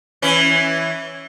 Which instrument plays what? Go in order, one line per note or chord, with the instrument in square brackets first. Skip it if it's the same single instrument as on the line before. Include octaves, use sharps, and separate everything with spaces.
[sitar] E3 C#4